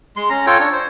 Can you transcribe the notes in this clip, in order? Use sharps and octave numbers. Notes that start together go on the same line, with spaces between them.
G#3 C6
C#4 A#5
F4 A4 C#5 G5
D4 C#5
C5